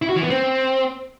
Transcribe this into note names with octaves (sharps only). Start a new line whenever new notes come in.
E4
F#4
E3
B3
C4